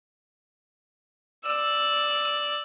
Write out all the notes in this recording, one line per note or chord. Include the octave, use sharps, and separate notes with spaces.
D5 E6